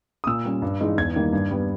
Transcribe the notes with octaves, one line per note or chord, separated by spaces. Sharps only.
D#6
A#2 E6
G3 C#4
G2
E3 G#3 D#4
E2 G#6
D#3 G3 A#3 D#4
G2
G3 B3